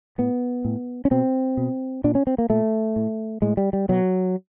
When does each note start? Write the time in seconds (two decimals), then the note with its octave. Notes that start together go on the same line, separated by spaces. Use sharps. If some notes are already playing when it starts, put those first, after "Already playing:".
0.18 A2 B3
0.65 A2
1.05 C#4
1.11 B2 C4
1.57 B2
2.04 A#2 D4
2.15 C#4
2.27 C4
2.38 A#3
2.50 A#2 A3
2.96 A2
3.42 A2 G#3
3.57 G3
3.73 G3
3.89 B2 F#3